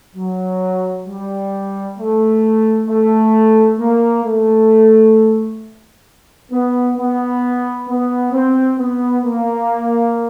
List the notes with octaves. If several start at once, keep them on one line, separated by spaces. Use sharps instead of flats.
F#3
G3
A3
A3
A#3
A3
B3
B3
B3
C4
B3
A#3